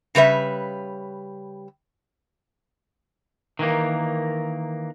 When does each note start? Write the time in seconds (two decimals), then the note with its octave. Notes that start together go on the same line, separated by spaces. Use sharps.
0.15 C#3 G3 B4 E5
3.59 D#3 E3 A#3